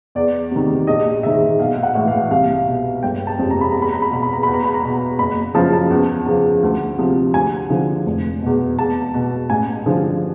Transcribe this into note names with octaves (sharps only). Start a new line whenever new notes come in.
E2 D5
C3 D#3
A#1 D#5
G#2 D#3 E5
B1 F5
F5
F#5
A2 E3
F5
C2 F5
B2
G1 G5
A5
F2 C3
A#5
B5
E2 A#5
B5
A#5
B5
B2 A#5
B5
A#5
E2 B5
A#5
B5
A#5
B2
F#1 B5
F#2 C#3 F3 A5
A5
E2
C#3 F3
D2
C3 F3
D2 G#5
D3 F3
F1
E2 B2
E2 A5
B2
A1 G#5
G2 D3 F3